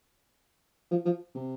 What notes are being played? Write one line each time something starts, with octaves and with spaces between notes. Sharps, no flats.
F3
F3
C3